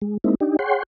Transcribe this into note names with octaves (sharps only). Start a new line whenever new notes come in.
G#3
G#3 A#3 C4 D#4 E4
D4 D#4 G4
G#4 C#5 F#5 G5 C6